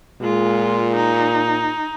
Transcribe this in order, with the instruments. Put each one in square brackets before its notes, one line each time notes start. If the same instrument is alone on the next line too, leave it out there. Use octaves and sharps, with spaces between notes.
[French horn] A#2 [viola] G#3 F4
[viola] D#4